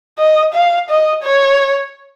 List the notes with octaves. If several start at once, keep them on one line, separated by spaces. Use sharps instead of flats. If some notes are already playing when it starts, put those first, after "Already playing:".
D#5
F5
D#5
C#5